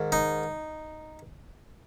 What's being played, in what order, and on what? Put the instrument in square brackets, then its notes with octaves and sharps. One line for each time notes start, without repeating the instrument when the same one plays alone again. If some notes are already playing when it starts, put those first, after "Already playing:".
Already playing: [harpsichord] G#2 D#3
D#4